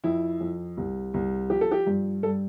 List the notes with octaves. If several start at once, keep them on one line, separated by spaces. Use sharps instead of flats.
F2 E4
F2
C2
C2
F3 G4
A4
G4
G2
G2 A4